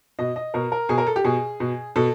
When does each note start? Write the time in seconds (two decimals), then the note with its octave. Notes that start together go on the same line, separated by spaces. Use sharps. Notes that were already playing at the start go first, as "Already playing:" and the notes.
0.19 B2 D#5
0.36 D#5
0.54 B2 A#4
0.72 A#4
0.89 B2 G#4
0.98 A#4
1.07 A4
1.16 G4
1.24 B2 G#4
1.60 B2
1.96 B2 A4